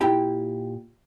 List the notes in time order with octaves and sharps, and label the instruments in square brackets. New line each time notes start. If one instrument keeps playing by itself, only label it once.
[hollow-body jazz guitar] A#2 E4 G4 G5